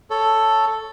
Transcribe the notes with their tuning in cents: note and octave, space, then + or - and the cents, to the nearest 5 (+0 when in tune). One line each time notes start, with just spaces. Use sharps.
A4 +0 C#5 +0